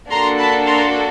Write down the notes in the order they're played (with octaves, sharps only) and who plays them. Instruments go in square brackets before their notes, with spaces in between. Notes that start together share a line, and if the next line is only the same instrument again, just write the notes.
[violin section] A#3 D4 F#4 A4 A#5 C6
A5 B5
A#5 C6